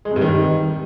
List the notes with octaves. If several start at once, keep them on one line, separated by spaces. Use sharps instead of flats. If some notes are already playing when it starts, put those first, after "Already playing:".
G#3
C3
G2
D#3